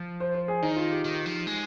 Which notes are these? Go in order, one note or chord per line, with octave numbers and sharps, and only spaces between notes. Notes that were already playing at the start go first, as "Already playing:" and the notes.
Already playing: F3
C5
C5
G#4
D#3 D#4
F4
G4
D#3
F3
G#3